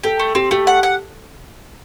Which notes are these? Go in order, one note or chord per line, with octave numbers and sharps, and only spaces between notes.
G4 A4
A3
C4 G4
A3 G4
F#5
F#5